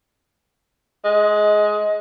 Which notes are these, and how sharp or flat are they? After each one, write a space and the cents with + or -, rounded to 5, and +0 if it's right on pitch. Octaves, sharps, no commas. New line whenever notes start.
G#3 +15